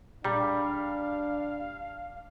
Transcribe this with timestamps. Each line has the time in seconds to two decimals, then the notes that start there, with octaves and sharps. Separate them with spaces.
0.24 A#2 G3 D4 F5 A#5